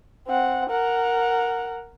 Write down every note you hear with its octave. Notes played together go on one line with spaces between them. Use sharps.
C4 F#5
A#4 F#5